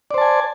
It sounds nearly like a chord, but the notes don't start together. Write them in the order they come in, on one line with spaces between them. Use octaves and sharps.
D5 C5 A5 G#5